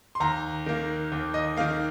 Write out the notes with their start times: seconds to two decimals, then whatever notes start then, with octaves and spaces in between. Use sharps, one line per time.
0.15 C6
0.20 D#2 A#5
0.66 D#3 A#3
1.12 D#2
1.34 D#5
1.56 D#3 A#3 F5